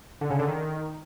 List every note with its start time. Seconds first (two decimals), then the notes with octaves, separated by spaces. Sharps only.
0.21 D3
0.30 C#3
0.39 D3
0.48 D#3